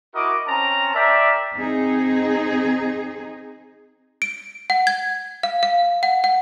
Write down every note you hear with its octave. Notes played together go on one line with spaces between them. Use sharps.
E4 F#4 A#4 D#5 D6
C4 C#4 A5 A#5
A#4 D5 E5 G5
C4 D#4 G#4
D7
F#5
G#6
F5
F5
F#5
F#5